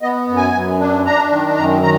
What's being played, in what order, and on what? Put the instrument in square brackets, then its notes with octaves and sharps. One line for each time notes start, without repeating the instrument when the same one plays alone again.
[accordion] B3 D#5
F#2
G#5
F#2
D4
D4 A#5
D#3
F#2 A#5
D#3 A#5